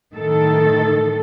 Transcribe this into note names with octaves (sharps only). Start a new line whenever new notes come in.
A2 D#3 A4